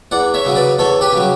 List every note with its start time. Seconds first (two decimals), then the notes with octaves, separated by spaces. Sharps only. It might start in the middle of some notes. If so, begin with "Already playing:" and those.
0.11 E2 D5 F#5
0.34 C#5 E5
0.45 C#3 F#3
0.56 B4 D5
0.79 E2 A4 C#5
1.01 G4 B4
1.12 C#3 F#3